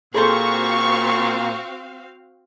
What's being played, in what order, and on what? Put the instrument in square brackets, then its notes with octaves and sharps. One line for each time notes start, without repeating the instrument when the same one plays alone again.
[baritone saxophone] A#2 [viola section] C4 F#4 F5 [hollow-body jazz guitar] G#4 A4 C5 [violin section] C#6